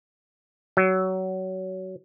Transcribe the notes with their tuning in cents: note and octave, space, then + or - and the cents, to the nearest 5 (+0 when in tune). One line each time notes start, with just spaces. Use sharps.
F#3 +20